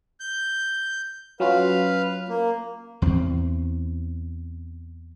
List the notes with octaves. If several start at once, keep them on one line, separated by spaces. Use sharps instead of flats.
G6
F#3 C#4 F4 B4 F5
A#3
E2 C4